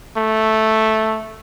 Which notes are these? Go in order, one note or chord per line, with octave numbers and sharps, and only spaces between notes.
A3